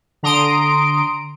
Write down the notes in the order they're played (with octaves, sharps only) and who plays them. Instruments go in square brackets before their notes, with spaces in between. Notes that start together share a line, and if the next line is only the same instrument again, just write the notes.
[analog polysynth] D3 A#5 C6 D#6 D7